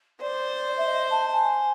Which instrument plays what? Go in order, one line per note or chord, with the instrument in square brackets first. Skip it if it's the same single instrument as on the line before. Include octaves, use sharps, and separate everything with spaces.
[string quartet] C5 [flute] D5
[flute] E5
D#5
A5
G#5